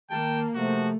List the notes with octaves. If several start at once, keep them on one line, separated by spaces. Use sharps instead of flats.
D#3 A#3 G5 A5
C3 F3 A3 F#4